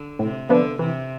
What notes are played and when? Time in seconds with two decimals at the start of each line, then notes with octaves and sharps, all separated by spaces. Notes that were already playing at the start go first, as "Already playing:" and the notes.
Already playing: D3
0.19 A2 C3
0.49 D3 F3 B3 D4
0.79 C3 E3